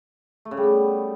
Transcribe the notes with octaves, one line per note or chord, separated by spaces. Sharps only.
A3
C#3
G3
B3